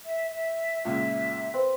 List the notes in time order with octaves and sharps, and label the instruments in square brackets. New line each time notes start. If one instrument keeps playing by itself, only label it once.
[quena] E5
E5
[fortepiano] C#2 A#2 C#3 [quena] E5
[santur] C4 [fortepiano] B4